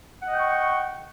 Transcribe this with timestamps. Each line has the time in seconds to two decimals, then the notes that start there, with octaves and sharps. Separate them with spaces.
0.22 F#5
0.27 D#5
0.32 G5
0.37 C#6